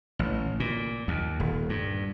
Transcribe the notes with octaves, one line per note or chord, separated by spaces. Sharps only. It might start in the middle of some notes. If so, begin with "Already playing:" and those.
A1
A#2
D#2
D#1
G2